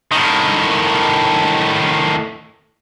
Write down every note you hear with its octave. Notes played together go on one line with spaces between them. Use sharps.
A2 D#3